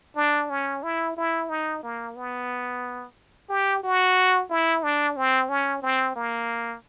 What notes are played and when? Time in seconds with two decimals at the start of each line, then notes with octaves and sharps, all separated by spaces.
0.16 D4
0.50 C#4
0.83 E4
1.17 E4
1.49 D#4
1.83 A#3
2.16 B3
3.49 G4
3.83 F#4
4.50 E4
4.83 D4
5.16 C4
5.49 C#4
5.82 C4
6.16 A#3